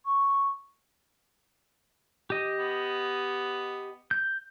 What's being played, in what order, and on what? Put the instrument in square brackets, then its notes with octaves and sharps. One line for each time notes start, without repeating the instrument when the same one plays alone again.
[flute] C#6
[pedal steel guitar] G4 D#5
[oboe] B3
[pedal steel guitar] G6